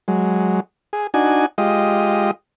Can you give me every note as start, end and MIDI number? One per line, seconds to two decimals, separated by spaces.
0.08 0.60 54
0.08 0.60 56
0.93 1.07 68
1.14 1.46 62
1.14 1.46 63
1.14 1.46 66
1.14 1.46 80
1.58 2.31 56
1.58 2.31 65
1.58 2.31 67
1.58 2.31 75